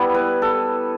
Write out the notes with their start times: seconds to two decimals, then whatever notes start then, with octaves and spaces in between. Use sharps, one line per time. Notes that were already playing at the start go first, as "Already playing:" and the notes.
Already playing: G3 B3 E4
0.15 B4
0.42 A4